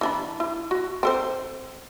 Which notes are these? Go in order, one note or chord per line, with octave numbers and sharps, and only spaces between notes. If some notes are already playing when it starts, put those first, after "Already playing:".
E3 D4 B5
E4
F#4
C4 A4 C5